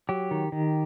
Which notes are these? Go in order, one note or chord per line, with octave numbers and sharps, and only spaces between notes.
F#3 G4
D#3
D#3